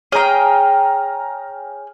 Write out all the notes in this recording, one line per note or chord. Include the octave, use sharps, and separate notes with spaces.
G#4 C#5 G5 A#5 F6